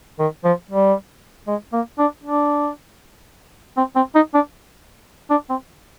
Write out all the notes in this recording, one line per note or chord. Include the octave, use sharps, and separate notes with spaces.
D#3
F3
G3
G#3
A#3
D4
D4
C4
C4
D#4
D4
D4
C4